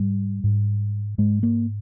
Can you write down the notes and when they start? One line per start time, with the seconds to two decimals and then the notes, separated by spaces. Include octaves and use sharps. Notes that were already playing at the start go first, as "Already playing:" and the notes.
Already playing: G#2 G3
0.44 G#2
1.18 G#2 G#3
1.43 A#3